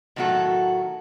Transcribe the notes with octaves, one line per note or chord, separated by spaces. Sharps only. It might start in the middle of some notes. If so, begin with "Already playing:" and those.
A2 D#3 F#3 C4 F#4 A4